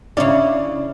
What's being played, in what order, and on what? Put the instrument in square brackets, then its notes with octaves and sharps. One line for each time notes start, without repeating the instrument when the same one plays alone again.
[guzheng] C#3 C#4 [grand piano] D4 [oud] E4 D5